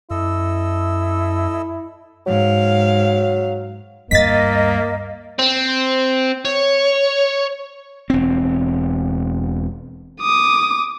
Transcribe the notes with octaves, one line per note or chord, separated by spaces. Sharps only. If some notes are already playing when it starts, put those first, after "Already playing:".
F#2 E4 A4 D#5 E6
G#2 F#3 F5
D2 G2 A#3 D#5 A6 B6
C4
C#5
E1 C4
D6 D#6